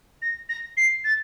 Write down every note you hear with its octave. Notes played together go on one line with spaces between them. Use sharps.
A#6
A#6
C7
A6